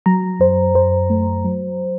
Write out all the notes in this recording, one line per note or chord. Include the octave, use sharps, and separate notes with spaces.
F#3 A#5
F#2 C5
F#2 C5
A3
F#3